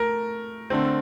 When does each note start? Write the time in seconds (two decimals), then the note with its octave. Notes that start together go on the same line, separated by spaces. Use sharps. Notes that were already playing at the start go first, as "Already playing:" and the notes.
Already playing: A3 A#4
0.70 D3 A3 C4